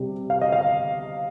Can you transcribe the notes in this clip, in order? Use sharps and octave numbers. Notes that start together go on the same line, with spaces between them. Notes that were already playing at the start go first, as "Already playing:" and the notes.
Already playing: C3 G3 C4
F5
D#5
F5